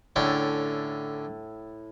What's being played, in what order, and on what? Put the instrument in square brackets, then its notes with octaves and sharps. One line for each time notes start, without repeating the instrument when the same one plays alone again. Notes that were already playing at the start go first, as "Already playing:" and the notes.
[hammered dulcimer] A2 [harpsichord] D3 C#4 G5